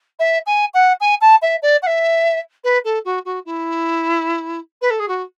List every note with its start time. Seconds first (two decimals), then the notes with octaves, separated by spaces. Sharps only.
0.19 E5
0.46 G#5
0.74 F#5
1.00 G#5
1.21 A5
1.42 E5
1.62 D5
1.82 F#5
1.86 E5
2.64 B4
2.84 A4
3.04 F#4
3.25 F#4
3.45 E4
4.81 B4
4.90 A4
4.99 G#4
5.08 F#4